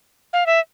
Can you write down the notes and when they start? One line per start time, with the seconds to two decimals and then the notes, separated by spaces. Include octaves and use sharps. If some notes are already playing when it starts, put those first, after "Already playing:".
0.33 F5
0.46 E5